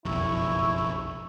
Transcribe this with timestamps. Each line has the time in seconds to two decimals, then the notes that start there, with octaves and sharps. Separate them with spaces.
0.05 F#1 B1 F2 E4 C#6